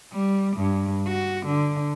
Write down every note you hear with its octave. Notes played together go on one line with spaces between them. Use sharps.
G3
G2
F#4
D3